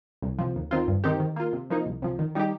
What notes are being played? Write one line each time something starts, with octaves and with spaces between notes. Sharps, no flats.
C2
C3 F3
D#2
D#3 C4 F4
G2
D#3 C4 D#4 G4
D#3
A#3 F4
C3
F3 A#3 D#4
C2
C3 F3
D#3
G3 D#4 G4